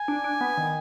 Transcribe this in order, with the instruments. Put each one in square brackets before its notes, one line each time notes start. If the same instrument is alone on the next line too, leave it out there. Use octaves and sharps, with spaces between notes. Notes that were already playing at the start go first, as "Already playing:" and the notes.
Already playing: [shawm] G#5
[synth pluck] D4
D4
B3
D#3